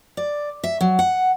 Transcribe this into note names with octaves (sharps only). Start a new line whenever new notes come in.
D5
E5
F#3
F#5